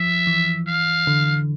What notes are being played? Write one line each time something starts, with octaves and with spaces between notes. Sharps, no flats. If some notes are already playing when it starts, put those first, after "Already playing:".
Already playing: F3 E5
E3
F5
D3